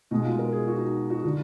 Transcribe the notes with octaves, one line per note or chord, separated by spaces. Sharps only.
B2 G#3 D#4
F4
A#4
G#4
F#4
D#4
F#4
D3 F#3 F#4